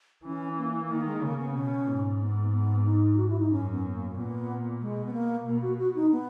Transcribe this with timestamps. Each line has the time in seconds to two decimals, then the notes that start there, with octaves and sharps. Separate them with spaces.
0.25 E3 C#4
0.58 A#3
0.90 D#3 A#3
1.07 G#3
1.23 C#3 A#3
1.39 B3
1.55 B2 C#4
1.89 G#2
2.21 B3
2.53 B3
2.86 D#4
3.17 F#4
3.29 E4
3.39 D#4
3.51 F#2 C#4
3.72 B3
3.94 A#3
4.12 A#3
4.16 A#2 B3
4.81 B2 G#3
5.06 B3
5.13 A#3
5.46 B2 A#3
5.62 F#4
5.79 F#4
5.95 D#4
6.12 B3